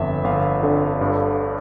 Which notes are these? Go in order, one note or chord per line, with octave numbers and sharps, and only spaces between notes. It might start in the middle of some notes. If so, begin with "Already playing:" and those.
Already playing: G1 F2 E5
G1 F5
D3
G2